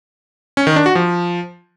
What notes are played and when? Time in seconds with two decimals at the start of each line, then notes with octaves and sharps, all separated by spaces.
0.57 C#4
0.67 D#3
0.76 D4
0.86 F#4
0.95 F3